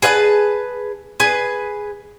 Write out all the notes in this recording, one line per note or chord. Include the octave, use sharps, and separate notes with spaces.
G#4 B4 E5 A5
G#4 B4